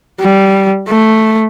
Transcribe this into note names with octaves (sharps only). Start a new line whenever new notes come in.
G3
A3